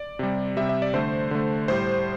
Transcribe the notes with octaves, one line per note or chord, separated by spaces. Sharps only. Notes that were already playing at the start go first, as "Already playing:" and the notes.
Already playing: D5
C3 G3
C3 G3 E5
E5
D5
D3 A3 C5
D3 A3
A2 G3 C5